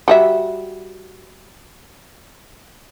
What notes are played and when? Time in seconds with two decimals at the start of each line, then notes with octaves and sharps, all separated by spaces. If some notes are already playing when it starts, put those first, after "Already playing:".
0.08 G3 F#4 E5